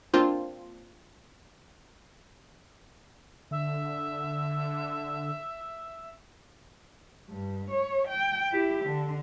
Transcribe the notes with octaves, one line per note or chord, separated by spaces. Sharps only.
A#3 C4 D4 F4 C5
D3 E5
G2
C#5
G5
E4 G4
D3